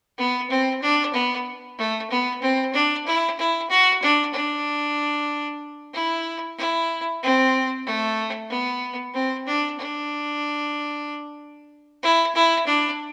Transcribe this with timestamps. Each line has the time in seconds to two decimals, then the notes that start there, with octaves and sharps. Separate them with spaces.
0.18 B3
0.50 C4
0.82 D4
1.14 B3
1.78 A3
2.11 B3
2.42 C4
2.74 D4
3.07 E4
3.39 E4
3.70 F#4
4.02 D4
4.34 D4
5.94 E4
6.58 E4
7.23 C4
7.86 A3
8.50 B3
9.14 C4
9.47 D4
9.79 D4
12.03 E4
12.35 E4
12.67 D4